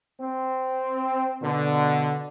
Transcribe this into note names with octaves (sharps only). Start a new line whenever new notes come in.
C4
B2 D3